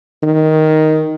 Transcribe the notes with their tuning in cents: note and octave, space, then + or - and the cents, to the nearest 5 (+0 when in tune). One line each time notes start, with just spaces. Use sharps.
D#3 +5